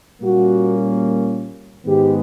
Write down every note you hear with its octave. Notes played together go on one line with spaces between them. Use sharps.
A#2 G3 A#3 C#4 F#4
G#2 D#3 G#3 B3 G4